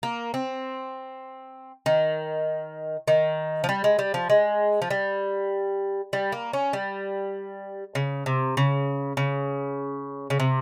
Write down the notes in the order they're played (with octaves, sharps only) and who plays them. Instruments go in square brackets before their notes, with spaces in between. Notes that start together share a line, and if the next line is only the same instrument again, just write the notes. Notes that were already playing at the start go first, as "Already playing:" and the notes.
[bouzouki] A#3
C4
D#3
D#3
F3
G3
G#3
G3
F3
G#3
F3
G3
G3
A#3
C#4
G3
C#3
C3
C#3
C#3
C#3
C3